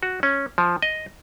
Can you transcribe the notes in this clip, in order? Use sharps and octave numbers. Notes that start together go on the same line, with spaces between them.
F#4
C#4
F3
D#5